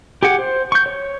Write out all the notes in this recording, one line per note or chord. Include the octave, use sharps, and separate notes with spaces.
G4 G#4 F#5
C5
C#6 G6
C#5